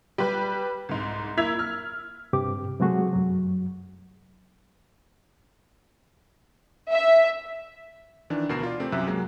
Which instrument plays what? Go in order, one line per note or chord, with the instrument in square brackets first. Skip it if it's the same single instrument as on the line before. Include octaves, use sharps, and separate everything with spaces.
[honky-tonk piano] G3 B4
C2 G#2
A#3 E4 E6 G#6 B6 F7
F6
[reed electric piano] G2 C3 G4 D6
C3 F#3 G#3 A3 F#4 G#4
F#2 F#3
[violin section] E5
[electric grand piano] D#3 E3 D4
D2 B2 A#4 C7 E7
F4 D5
C3 A3 C4
C2 F#2 C3 E5 F#6
F#3 G#3 A#3